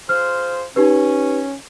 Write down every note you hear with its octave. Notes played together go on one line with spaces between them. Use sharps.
F4 G#4 C5 F6
C#4 D#4 G4 B4